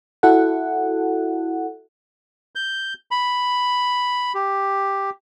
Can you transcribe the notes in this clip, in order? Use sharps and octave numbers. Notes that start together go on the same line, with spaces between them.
E4 F#4 A4 F#5
G6
B5
G4